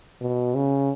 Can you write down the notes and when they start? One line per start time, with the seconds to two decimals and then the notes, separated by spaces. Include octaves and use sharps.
0.21 B2
0.55 C#3